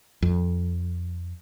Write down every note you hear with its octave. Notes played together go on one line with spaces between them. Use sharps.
F2